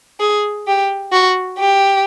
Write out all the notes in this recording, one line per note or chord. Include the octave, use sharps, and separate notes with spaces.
G#4
G4
F#4
G4